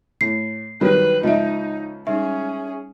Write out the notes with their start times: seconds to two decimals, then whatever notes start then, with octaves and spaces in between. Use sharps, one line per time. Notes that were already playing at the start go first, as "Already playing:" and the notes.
0.21 A2 C7
0.81 D#3 F#3 G3 B4
1.23 C#2 F3 D#4 D#5 E5
2.07 G3 C#4 D#4 G#4 E5